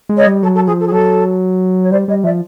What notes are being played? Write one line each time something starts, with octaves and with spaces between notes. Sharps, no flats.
G#3
C#5 D#5
G3
F#3 A4
A4
F3 G#4
A4
G#4
F#3 A4
C#5
G3 C5 D5
G3 C#5 D#5
F3 D5 E5